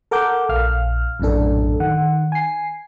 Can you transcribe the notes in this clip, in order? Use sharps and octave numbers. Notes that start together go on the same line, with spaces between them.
A4 A#4 F#5 D6 G6
A#1 F5 F6
A#1 F#2 A2 D4 A4
D#3 F#5
G#5 C7